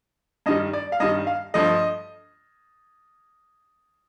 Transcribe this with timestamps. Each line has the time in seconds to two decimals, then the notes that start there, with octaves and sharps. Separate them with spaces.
0.46 G2 D#3 G3 D#5
0.73 D5
0.92 F5
1.00 G2 D#3 G3 D#5
1.27 F5
1.54 G2 F3 A3 D#5